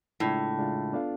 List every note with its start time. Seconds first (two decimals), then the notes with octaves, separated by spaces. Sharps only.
0.20 A2 C#3 G#3 D4 F4
0.57 C#3 G#3 D4 F4
0.93 B3 D4 F4 A4 F5